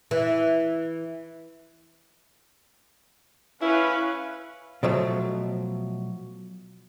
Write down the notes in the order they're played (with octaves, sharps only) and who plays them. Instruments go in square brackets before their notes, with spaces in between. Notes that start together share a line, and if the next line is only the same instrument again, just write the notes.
[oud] E3
[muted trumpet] C#4 [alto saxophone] E4 [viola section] B4 F5
[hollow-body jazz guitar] B2 F3 F#3 A3